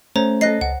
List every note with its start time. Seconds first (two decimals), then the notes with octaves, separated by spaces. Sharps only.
0.16 A3 C#4 C5 C#5 A#5
0.41 A4 D#5 F#6 A#6 C7
0.61 C#2 F#5